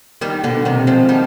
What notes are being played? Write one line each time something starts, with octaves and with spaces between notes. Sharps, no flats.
D#3 G3
B2 D3
C3 D#3
F3 G#3
D#3 G3